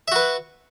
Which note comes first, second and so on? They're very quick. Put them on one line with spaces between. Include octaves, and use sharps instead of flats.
E5 F#4 B4